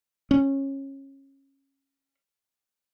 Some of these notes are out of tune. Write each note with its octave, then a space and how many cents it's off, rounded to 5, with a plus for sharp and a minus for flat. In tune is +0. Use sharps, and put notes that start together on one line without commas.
C#4 -20